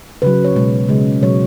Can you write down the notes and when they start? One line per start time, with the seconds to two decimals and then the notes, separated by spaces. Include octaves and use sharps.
0.22 C#3 F#3 B4
0.44 C#5
0.56 B2 G#3
0.88 C#3 G#3
1.22 B2 F#3 C#5